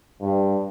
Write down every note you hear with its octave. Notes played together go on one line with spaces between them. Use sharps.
G2